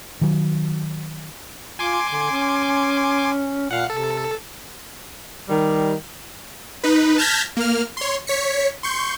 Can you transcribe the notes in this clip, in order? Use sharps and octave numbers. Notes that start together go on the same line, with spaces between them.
D#3 F#3
F4 G#5 C6 D6
D3
C#4
A#2 F5 F#5
C3 A4
D#3 G3
D#4 B4
A5 F6 G6 G#6 A#6 B6
A#3 F6
C#5 C6
C#5 B6 C#7
C6 C#6 G6